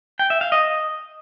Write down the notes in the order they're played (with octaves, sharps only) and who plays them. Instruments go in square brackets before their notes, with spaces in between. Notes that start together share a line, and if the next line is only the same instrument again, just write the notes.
[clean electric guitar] G5
E5
F5
D#5